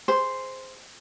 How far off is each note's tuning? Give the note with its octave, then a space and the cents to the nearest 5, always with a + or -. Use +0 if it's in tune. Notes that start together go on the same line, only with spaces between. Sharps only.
G#4 -5 C5 -5